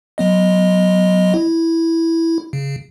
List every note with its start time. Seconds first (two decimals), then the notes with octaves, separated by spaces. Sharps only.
0.18 F#3 B3 D#5
1.34 E4
2.53 C#3